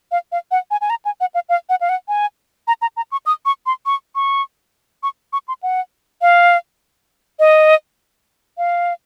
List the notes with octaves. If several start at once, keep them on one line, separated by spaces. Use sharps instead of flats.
F5
F5
F#5
G#5
G#5
A#5
G#5
F#5
F5
F5
F#5
F5
F#5
G#5
A#5
A#5
A#5
C#6
D#6
C#6
C6
C#6
C#6
C#6
C#6
C6
F#5
F5
D#5
F5